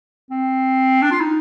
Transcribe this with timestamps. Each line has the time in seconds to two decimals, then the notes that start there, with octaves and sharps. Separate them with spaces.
0.31 C4
1.02 D4
1.11 F4
1.21 D#4